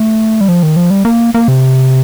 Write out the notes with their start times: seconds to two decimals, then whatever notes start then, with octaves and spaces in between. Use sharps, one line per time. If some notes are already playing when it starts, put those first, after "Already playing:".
Already playing: A3
0.41 G3
0.48 F3
0.63 D#3
0.76 F3
0.90 G3
1.05 A#3
1.34 A#3
1.48 C3